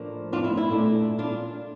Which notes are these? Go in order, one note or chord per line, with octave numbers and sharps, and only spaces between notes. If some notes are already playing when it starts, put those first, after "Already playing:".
Already playing: A2 F3 A#3 D4
D4 F4
E4
E4
A#2 A3 D4
D4 F4